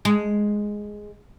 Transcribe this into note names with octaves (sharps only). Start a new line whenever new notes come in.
G#3